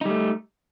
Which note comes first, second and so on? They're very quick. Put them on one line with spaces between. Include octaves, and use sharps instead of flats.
D#4 G3 A3